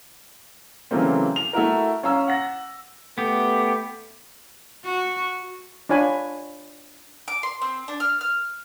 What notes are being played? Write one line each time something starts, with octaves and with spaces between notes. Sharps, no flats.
C#3 E3 F#3 A3 A#3 C4
F7
A3 E4 F#4 A#4
C#4 F5 G#5 A#5 E6
F#5 A#6
A3 B3 G4
F#4
D4 F4 C#5 G#5 B5
D6
C6
C4
D4
F6
F6